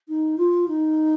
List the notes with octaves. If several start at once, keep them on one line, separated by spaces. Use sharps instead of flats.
D#4
F4
D#4